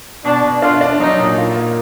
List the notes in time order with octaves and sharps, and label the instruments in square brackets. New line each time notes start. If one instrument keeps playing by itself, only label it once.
[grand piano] B2 [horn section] D4
[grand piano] B2
[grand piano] D4 [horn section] F4
[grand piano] D4
[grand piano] F#3 [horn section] D#4
[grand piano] A#2
F4
A#3